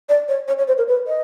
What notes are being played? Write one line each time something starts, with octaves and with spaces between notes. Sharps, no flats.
D5
C#5
C#5
C#5
C5
A#4
B4
D#5